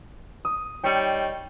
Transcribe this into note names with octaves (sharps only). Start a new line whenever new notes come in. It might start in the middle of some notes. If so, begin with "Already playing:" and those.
D#6
G3 D#4 C#5 G5 C#7